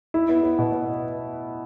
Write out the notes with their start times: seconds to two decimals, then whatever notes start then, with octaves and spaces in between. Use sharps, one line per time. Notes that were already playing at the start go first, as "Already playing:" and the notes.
0.14 E4
0.29 B3
0.43 B3
0.59 B2
0.72 B3